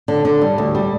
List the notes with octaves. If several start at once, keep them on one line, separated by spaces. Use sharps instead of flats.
D3
D3
G3
D2
G3